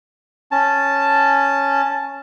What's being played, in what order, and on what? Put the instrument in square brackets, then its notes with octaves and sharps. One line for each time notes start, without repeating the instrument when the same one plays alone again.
[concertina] C#4 A5